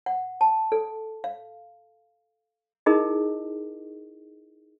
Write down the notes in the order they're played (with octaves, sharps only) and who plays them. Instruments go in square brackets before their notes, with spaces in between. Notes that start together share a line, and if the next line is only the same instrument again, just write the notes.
[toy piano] F#5
A5
A4
F5
D#4 E4 G#4 A#4 D#5